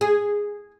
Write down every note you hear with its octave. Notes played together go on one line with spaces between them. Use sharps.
G#4